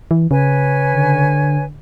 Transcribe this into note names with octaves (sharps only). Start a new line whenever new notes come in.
E3
C#3 B4 C#5 G#5
D3